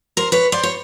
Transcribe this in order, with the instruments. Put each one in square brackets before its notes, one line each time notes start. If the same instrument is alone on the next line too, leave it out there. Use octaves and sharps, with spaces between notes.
[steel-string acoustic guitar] A#4 C5
B4 C#5
C5 D5
C#5